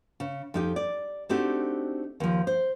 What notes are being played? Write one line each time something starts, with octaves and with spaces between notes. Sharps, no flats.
C#3
F2 D#4 G4
D5
A3 C4 D4 D#4 F#4 G4
D#2 F3
C5